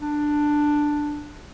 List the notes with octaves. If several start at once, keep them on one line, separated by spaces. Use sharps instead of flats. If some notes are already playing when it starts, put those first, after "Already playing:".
D4